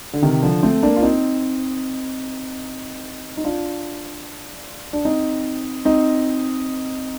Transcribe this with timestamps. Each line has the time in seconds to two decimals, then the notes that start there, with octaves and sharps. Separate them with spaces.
0.13 D3
0.22 C3 D#3
0.43 D3 F3
0.63 A3 C4
0.83 A#3 D4
0.97 F4
1.03 C4 D#4
3.37 D#4
3.44 D4 F4
4.93 D4
5.05 C4 D#4
5.85 C4 D#4